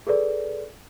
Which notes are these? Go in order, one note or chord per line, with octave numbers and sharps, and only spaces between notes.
G#4 A4 B4 D5